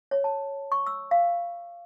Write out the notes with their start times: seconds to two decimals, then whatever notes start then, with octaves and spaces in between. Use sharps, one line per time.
0.11 C#5
0.24 A5
0.72 C#6
0.86 E6
1.11 F5